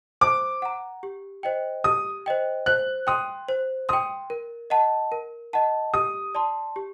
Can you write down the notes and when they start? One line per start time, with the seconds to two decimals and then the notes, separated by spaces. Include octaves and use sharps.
0.21 C5 D6
0.62 F#5 A#5
1.03 G4
1.43 C5 D#5 G5
1.84 G4 D#6
2.26 C5 D#5 G5
2.66 C5 F#6
3.07 G5 C6 D#6
3.49 C5
3.89 G5 C6 D#6
4.30 A#4
4.70 D#5 F#5 A5
5.12 A#4
5.53 D#5 F#5 A5
5.94 G4 D#6
6.35 D5 A5 C6
6.76 G4